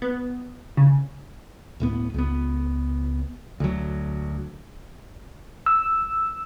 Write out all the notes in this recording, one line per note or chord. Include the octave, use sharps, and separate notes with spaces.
B3
C#3
D1 A2 B3
C#2 B3
D2 F#3
E6